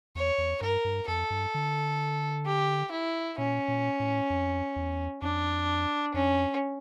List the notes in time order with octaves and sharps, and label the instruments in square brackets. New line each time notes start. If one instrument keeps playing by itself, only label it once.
[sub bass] E2 [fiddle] C#5
[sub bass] E2
[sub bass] G2 [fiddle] A#4
[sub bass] G2
[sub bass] F2 [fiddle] A4
[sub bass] G2
D3
[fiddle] G4
E4
[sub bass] A#2 [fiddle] C#4
[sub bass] A#2
A2
F2
E2
[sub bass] F2 [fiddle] D4
[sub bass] F2 [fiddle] C#4